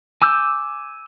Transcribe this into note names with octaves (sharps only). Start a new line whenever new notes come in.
G#5 D6 E6 G6